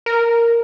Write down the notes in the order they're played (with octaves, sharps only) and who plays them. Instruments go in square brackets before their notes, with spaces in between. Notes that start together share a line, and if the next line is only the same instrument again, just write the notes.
[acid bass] A#4